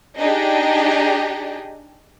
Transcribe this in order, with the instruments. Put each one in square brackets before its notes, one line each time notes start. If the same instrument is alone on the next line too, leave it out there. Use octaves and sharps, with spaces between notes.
[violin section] D4 D#4 G4 G#4 D#5